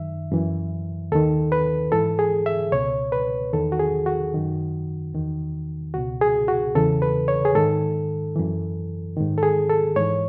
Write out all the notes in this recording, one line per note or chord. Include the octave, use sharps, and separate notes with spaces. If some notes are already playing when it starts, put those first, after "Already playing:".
Already playing: F#2 D#3 E5
F#2 E3
D#2 D#3 A4
B4
G#2 E3 A4
G#4
E5
C#2 B2 C#5
B4
E2 D#3 A4
F#4
G#4
F#4
F#2 D#3
E2 D#3
C#2 B2 F#4
G#4
F#4
E2 C#3 E3 A4
B4
C#5
G#4
G#2 D#3 A4
F#2 E3
G#2 D#3
A4
G#4
A4
G#2 E3 C#5